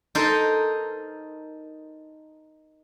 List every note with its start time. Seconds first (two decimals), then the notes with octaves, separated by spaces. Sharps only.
0.15 D#4 A4 A#4 C5 D#5